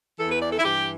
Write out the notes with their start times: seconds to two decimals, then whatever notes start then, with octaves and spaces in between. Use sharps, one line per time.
0.18 E2 E3 A4
0.31 B4
0.41 D5
0.52 A4
0.59 E4
0.64 G2 E3 G4